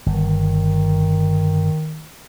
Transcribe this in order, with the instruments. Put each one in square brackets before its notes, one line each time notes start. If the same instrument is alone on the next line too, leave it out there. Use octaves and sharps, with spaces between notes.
[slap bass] G1 [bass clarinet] D#3